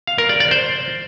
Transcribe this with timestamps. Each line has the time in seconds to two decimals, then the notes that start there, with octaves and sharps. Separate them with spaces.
0.07 F5
0.18 A#4
0.29 D5
0.40 D5
0.51 C5